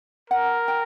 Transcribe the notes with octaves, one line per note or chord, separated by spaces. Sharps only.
A#4 F#5
G5